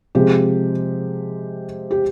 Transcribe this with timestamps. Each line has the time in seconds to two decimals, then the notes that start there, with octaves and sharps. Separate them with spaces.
0.15 C3 F3 G#3 G4
1.91 G4